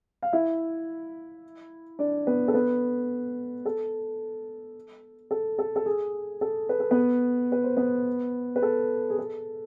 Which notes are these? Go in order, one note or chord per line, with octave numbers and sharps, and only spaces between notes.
F5
E4 E5
D4 D5
B3 B4
A4
B3 B4
A4
A4
A4
A4
G#4
A4
B4
A4
B3 B4
B4
C5
B3 B4
B4
A4
G#4
A4